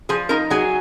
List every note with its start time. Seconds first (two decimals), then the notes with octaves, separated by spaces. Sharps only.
0.09 F3 G#4 G#5
0.29 D#4 A#4 A#5
0.50 F#3 G#4 G#5